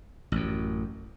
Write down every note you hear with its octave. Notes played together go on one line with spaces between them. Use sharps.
A1 F#2